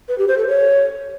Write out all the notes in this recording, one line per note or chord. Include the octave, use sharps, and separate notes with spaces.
B4
G4
C5
A4
C#5